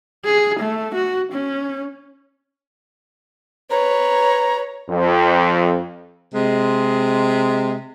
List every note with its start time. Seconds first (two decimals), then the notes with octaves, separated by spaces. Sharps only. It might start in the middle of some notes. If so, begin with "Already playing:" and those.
0.25 G#4
0.59 A3
0.94 F#4
1.32 C#4
3.71 B4 C#5 A#5
4.89 F2
6.34 C3 G#3